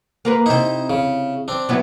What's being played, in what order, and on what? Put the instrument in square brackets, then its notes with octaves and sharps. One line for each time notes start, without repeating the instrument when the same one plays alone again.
[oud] A#3 A#4 B4
[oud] C3 E4 [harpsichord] D#4 C5
[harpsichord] C#3
C4 D4
[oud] F#3 B3 E4